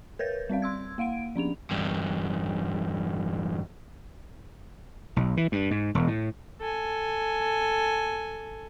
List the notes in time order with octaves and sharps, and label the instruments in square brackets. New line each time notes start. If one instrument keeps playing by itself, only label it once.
[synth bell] A#4 B4 C#5 G6 A6
G3 C4 D5 F5
C6 E6 G#6
A#3 F5 F#5 D7
F3 C#4 D4 F7
[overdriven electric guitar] E2 G2
[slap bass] B1
E3
G2
G#2
E1
A2
[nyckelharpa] A4 G#5